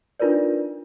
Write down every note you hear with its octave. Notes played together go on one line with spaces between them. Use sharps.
D4 D#4 F4 A#4 B4 D5